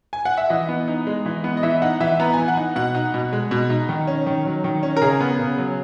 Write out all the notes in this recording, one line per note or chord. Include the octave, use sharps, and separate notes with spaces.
G#5
F#5
E5
E3 D#5
B3
D#4
G#3
E3
B3
D#5
E3 E5
D#4 F#5
E3 E5
B3 A#5
E3 G#5
F#5
D#4
B2 F#5
D#4
B2
G#3
B2
D#4
D#3
C#4
D#3
F#3
D#3
C#4
A#4
C#3 G#4
B3
C#3
F#3